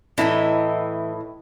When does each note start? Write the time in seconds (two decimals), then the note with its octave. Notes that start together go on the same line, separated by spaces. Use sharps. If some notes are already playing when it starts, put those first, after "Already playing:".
0.18 A2 E3 E4 D#5 A#5